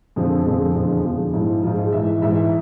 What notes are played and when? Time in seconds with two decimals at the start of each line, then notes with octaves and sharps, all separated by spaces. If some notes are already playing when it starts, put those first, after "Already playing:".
0.16 F2 D3 F3 G#4
0.45 F2 D3 F3 G#4
0.60 G#4
0.75 E2 D3 F3
1.04 E2 D3 F3 F4
1.33 G#2 F3 E4
1.63 F3 F4
1.67 G#2
1.74 G#4
1.93 G#2 E3 E5
2.22 G#2 E3 E5